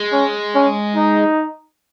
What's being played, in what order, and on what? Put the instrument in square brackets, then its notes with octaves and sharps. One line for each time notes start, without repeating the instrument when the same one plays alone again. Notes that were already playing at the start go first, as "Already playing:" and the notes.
Already playing: [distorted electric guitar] G#3
[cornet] C#4
C#4
D#4